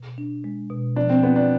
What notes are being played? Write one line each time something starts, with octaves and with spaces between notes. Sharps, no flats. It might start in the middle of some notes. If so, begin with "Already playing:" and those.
Already playing: B2
D4
G#3
B2
F3 D4
C4
B3 F4
D4